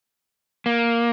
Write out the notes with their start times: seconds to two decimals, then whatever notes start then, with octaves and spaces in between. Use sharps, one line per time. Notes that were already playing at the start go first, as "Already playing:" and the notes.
0.66 A#3